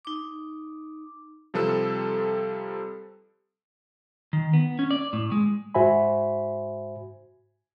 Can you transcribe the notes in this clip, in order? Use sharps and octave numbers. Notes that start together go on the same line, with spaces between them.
D#4 D6
C3 F3 G3 A4 B4 E6
D#3
B3
C#4
D5
A2
G#3
G#2 F#4 C5 E5 G#5 B5